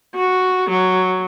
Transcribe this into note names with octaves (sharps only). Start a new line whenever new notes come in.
F#4
F#3